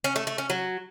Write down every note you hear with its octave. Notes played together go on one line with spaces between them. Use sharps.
C#4
A3
A3
C#4
F#3